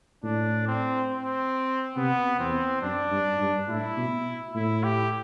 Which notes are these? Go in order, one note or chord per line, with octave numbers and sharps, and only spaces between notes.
A2 D4
C4
C4
C3 B3
E2 C4
F#2 D4
G2
G2
A2 E4
B2
A2 E4
G4